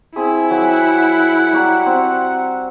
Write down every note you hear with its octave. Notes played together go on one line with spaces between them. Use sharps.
C4 E4 G#4 B5
F#3 F#5 G#5 B5
G3 F#4 A#5
C4